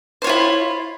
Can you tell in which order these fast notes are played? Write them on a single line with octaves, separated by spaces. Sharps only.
C5 C#5 F4 E4